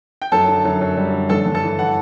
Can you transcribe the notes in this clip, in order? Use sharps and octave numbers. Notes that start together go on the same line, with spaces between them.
G5
F#2 A4 A5
D3
F#2
F#2
G3
D3
G2 A4 A5
G2
A4 A5
E3
E3 F#5